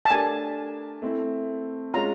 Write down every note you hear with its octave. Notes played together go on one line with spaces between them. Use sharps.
A5
A3 D4 G4 A#4 G#5
A3 C4 E4
G#3 C#4 F4 A#5